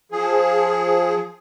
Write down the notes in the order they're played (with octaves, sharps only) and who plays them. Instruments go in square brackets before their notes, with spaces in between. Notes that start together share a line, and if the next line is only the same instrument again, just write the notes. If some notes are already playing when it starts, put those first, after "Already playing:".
[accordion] F3 G#4